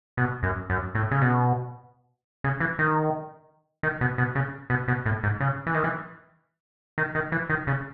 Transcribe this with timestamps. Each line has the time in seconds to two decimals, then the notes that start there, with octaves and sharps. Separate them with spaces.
0.17 B2
0.43 F#2
0.70 F#2
0.95 A2
1.11 C#3
1.22 B2
2.44 C#3
2.60 E3
2.79 D#3
3.83 D#3
4.01 B2
4.18 B2
4.35 C#3
4.70 B2
4.88 B2
5.06 A2
5.23 G#2
5.41 C#3
5.67 E3
5.74 D#3
5.84 E3
6.98 D#3
7.15 D#3
7.32 E3
7.50 D#3
7.67 C#3